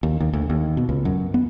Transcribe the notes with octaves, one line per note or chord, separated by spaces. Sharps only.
D#2
D#2
D2
D#2
B2
C#2
F#2
B3